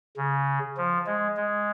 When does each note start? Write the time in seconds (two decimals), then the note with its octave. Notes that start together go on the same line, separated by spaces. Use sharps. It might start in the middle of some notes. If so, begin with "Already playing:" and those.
0.17 C#3
0.77 F3
1.06 G#3
1.37 G#3